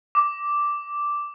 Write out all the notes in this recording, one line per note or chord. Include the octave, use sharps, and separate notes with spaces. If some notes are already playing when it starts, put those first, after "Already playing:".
D6